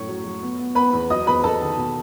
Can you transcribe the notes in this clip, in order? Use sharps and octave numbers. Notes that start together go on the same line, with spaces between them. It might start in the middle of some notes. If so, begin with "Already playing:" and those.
Already playing: F#2 A2 A3 C#5 C#6
F#3
F#3
B3
B3
B3 B4 B5
E2
F#3 D#5 D#6
E2 B4 B5
E2 A4 A5
D#3
B2